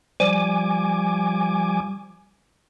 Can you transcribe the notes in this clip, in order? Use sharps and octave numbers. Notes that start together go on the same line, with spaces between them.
F3 G3 G#5 D6